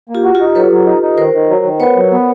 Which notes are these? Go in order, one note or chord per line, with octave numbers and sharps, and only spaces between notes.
A#3
F4 G4
F#4
F4 G4
D#4
F#3 A4 B4
F#3
D#4
D#4
D#3 A#4 C5
D#3
F#3
D#3
B3 B4 C#5
F#3
B3